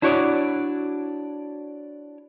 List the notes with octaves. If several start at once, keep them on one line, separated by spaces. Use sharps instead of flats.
D4 E4 F#4 C#5 D5